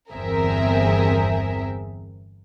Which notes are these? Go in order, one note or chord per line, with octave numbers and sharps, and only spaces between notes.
G1 E2 C4 G#4 A#4 E5